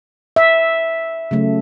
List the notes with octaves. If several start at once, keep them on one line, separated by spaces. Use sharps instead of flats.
E5
C#3 F#3 A3